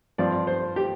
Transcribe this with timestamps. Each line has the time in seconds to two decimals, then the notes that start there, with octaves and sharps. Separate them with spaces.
0.18 G2 F3 C4 F4 D5
0.47 C5
0.76 G4